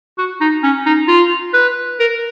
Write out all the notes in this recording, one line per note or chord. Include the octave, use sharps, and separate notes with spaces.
F#4
D#4
C#4
D#4
F4
B4
A#4